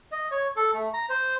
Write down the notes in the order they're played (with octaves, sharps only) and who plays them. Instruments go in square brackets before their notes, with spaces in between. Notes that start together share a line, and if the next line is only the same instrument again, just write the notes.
[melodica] D#5
C#5
A4
A3
A#5
C5